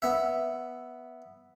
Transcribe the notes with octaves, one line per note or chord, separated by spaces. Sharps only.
B3 E5